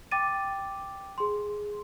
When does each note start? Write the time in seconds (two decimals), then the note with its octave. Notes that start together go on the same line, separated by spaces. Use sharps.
0.11 G5 D6 A6 D#7
1.18 G#4 C6